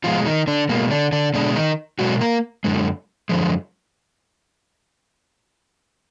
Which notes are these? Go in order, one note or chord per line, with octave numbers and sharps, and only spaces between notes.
B2 F3 G#3 F4
D#3 D#4
D3 D4
B2 G#3 A#3
D3 D4
D3 D4
B2 D3 G#3 D4
D#3 D#4
B2 F#3 G#3 F#4
A#3 A#4
F#2 D3 G#3
F#2 D3 F3 G#3